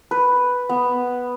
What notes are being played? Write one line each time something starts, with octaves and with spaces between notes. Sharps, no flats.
B4
B3